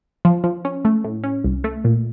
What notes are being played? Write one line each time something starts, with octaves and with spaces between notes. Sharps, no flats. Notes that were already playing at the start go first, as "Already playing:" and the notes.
F3
F3
C#4
A3
A2
C#4
C2
A3
A#2